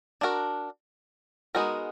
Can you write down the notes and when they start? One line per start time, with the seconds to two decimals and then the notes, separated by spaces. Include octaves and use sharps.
0.21 D4 F#4 A#4
1.55 G#3 B3 D#4 F#4 A#4